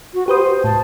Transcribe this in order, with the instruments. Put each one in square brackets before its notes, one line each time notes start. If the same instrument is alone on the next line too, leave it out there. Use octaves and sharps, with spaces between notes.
[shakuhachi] F#4
[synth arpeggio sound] G4 B4 D#6 [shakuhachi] C5
[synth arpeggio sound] A2 [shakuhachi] A5